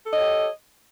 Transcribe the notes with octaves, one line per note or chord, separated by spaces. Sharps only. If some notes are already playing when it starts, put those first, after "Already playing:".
G4 A4 C#5 D#5